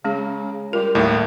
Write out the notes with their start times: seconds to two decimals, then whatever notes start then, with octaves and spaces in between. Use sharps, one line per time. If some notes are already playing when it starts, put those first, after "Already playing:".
0.04 C#3 G#3 C#4 G#4
0.73 G3 F4 G4 A#4
0.95 D#2 A2 G3 A3 E4 E5